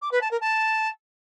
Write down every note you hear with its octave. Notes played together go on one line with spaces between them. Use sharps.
D6
B4
A5
A#4
A5